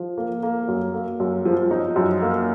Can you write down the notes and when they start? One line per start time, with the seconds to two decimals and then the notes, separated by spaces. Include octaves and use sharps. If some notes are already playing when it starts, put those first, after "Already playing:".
Already playing: F3
0.18 A#3
0.43 A#3
0.68 F#2
0.94 A#3
1.20 F#2
1.45 F3
1.71 D#4
1.96 F#2
2.22 A#3